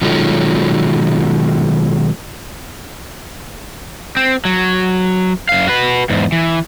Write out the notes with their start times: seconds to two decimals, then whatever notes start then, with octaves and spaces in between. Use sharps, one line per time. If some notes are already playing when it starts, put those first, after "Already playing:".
0.01 B2 D#3 F#3 G#3 F4 A4
4.17 C4
4.45 F#3
5.49 F#2 F5
5.67 F#4 B4
6.10 E2 G#2
6.32 E3